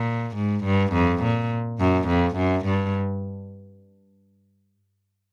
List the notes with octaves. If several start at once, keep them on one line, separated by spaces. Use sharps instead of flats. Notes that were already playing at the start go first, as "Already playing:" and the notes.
Already playing: A#2
G#2
G2
F2
A#2
F#2
F2
F#2
G2